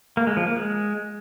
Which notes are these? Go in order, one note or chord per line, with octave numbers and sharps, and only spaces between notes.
A#3
G#3
F3
A#3
G#3